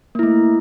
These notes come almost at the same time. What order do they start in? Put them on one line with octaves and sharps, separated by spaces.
A#3 E4 A3